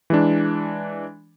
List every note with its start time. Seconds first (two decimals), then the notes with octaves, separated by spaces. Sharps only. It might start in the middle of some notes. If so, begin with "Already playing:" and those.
0.10 E3 G#3 D4